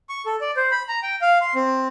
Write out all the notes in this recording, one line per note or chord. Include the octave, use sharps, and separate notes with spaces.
C#6
A4
D5
C5
B5
A#5
G5
F5
C6
C4